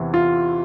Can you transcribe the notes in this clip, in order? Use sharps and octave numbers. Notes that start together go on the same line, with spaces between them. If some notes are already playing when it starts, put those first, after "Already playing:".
Already playing: E2 C3 E3
F4